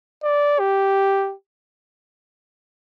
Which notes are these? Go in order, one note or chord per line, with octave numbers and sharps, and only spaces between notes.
D5
G4